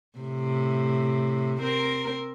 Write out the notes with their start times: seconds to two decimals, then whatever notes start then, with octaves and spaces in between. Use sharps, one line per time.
0.18 A2 C3
1.62 C4 A#4